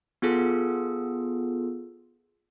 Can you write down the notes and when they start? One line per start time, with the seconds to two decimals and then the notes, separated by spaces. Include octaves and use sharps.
0.22 B3 F4 G#4 A4